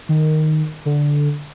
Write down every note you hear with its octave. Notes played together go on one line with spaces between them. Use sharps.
D#3
D3